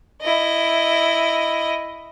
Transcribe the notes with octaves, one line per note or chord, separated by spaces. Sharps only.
E4 D#5